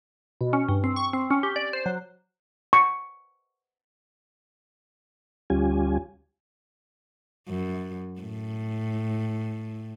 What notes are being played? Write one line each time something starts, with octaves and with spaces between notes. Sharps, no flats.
B2
C#4
G2
C4
C#6
C4
C#4
G4
D5
C5
F#3
C#6
D2 G3 C#4 F4 G4 G#5
F#2
A2